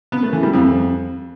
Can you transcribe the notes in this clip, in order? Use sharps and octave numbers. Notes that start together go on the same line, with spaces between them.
B3
A3
E3
G3
F2